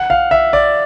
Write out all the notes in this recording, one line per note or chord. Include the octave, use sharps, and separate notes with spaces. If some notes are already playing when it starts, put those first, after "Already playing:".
Already playing: F#5
F5
E5
D5